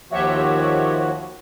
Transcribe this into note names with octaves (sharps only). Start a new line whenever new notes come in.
D#2 F3 F#4 G4 C#5 E5